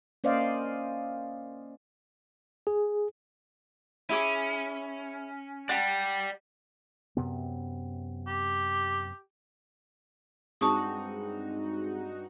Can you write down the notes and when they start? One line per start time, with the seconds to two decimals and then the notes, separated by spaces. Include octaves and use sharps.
0.24 A#3 C#4 C5 D5 D#5 F5
2.67 G#4
4.09 C#4 E4 G#4 D6
5.69 D5 F#5 G5 A5
7.17 F#2 C3 B3
8.27 G4
10.61 G2 G#3 C4 D#4 F#4 A5 C#6 D#6